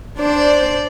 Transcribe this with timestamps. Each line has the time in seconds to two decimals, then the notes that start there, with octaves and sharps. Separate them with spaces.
0.17 D4 C5 D5